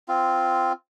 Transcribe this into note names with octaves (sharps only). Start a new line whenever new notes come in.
C4 F4